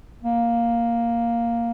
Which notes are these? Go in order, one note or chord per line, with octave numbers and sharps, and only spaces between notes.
A#3